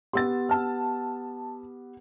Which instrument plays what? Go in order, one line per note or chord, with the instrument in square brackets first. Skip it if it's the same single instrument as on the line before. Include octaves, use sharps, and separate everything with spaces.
[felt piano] B3 G4 [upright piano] C6 E6 A6
[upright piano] A5 F6